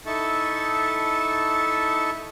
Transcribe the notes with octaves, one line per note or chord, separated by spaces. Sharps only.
D#4 E4 A4 E5 A5 C#6